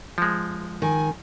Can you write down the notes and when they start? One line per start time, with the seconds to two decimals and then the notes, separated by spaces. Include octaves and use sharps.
0.18 F3 G#3
0.82 D#3 G#5